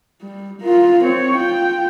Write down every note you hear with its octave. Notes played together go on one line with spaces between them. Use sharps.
G3
F4 A#4
C4 C#5
F4 G5